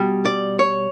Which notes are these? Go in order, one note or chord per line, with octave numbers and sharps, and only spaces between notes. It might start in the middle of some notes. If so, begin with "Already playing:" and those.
Already playing: B2 G3
D5
C#5